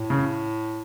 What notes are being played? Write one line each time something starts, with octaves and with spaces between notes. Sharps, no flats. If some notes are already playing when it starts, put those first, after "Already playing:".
Already playing: A2
C#3